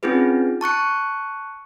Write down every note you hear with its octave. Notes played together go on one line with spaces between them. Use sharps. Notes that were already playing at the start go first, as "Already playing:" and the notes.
C4 C#4 D#4 F4 G#4 B4
A5 C#6 F#6 C#7